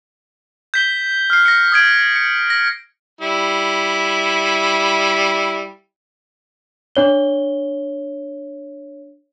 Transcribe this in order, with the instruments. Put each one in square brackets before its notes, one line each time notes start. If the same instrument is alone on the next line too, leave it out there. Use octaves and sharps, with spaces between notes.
[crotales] G6 B6 G7
F6 C7
A#6 C#7
D#6 G#6 D7
C#7
A#6
[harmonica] G3 E4
[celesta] D4 C#5 G7